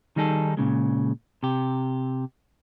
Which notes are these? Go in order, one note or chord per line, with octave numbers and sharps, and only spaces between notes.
D#3 G3 D#4 G#4 A4
A#2 C#3 G#3
C3 G4